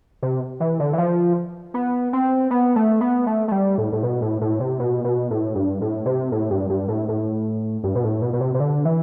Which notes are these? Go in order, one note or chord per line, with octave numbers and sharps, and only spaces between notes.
C3
E3
D3
E3
F3
B3
C4
B3
A3
B3
A3
A3
G3
A2
A2
B2
A2
A2
C3
B2
B2
A2
G2
A2
C3
A2
G2
G2
A2
A2
G2
B2
A2
B2
B2
C3
C3
D3
E3